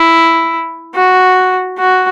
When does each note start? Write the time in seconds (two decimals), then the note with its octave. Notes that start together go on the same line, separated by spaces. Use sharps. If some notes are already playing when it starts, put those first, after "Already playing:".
Already playing: E4
0.95 F#4
1.79 F#4